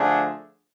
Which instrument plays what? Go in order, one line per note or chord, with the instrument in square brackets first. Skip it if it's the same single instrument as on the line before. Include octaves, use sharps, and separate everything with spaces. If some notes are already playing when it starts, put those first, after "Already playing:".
Already playing: [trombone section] D3 F3 A3 D4 G#4